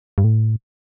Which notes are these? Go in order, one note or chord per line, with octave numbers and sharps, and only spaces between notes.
G2
A2